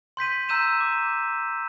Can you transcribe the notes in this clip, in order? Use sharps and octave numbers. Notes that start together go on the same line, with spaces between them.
C6 G6 B6 D#7
A#5 E6 G6 D#7 E7
D6